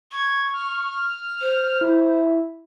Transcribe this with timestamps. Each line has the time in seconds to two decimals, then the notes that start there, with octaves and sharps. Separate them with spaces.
0.12 C#6 G#6
0.54 F6
1.41 C5
1.81 E4